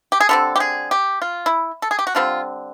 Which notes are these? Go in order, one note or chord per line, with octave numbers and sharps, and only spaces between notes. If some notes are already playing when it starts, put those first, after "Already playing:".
G4
G#4
D3 G3 C4 A4
G4
G#4
G4
F4
E4
A4
G#4
G4
F#4
D3 G3 C4 F4